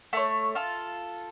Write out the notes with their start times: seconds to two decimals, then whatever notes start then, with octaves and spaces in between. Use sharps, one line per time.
0.13 A3 C#5
0.55 F4 A4